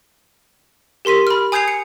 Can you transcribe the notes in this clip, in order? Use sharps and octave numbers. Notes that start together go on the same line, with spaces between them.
G4 A#4 C6 B6 D#7
B5 F6
G#5 D#6 G6 G#6 C7 F7
C#7